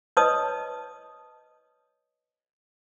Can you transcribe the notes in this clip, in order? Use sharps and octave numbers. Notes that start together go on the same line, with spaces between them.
B4 C#5 D#5 A5 D#6